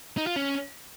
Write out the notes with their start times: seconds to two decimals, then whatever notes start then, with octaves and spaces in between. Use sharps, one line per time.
0.17 D#4
0.27 F4
0.36 C#4